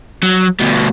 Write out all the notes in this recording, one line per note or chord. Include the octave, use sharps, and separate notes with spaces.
F#3
D2 B2